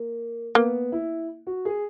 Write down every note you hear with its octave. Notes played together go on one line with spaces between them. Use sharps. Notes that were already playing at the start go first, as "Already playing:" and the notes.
Already playing: A#3
A#3 B3
E4
F#4
G#4